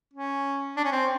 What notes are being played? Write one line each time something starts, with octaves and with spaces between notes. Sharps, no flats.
C#4
D4
C#4
C4